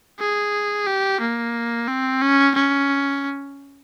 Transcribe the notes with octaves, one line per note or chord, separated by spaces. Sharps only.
G#4
G4
A#3
C4
C#4
C#4